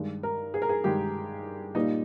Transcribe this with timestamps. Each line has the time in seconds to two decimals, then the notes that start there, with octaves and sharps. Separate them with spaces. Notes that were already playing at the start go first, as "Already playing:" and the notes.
Already playing: G2 D#3 G#3
0.23 A#4
0.54 G#4
0.62 A#4
0.69 G#4
0.84 G2 D#3 G#3 G4
1.75 A#2 G3 A#3 D#4